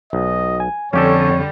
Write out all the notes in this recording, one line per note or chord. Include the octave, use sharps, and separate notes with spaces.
B1 D#5
G#5
F2 D3 G3 C#4 G4 A4 C#5